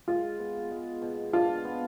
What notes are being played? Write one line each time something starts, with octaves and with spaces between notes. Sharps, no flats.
G#3 F4
B3
G#3
B2
D4 F4
B3